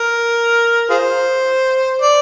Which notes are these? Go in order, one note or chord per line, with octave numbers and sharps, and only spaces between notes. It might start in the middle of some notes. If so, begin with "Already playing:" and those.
Already playing: A#4
F4 G#4 C5
D5